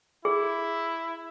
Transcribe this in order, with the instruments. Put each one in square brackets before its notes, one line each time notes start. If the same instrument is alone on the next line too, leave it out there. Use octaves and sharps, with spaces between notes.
[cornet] E4 [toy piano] G#4